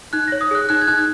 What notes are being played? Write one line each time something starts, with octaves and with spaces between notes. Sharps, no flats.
D#4 F#6
A#6
C#5
D#6
G#4 F#6
D#4 F#6
G#6
D#4 F#6